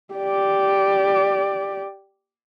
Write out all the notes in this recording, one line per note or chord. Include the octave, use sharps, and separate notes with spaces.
G4 D5